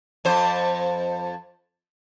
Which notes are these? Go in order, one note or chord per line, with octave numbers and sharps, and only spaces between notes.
F2 C5